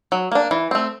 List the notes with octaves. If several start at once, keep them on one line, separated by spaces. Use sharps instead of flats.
F#3
A#3 D4
E3
A3 C4